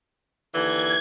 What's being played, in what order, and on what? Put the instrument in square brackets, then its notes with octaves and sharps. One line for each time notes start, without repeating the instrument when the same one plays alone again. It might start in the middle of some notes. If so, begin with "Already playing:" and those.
[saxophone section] D#2 D3 E3 [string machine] G#6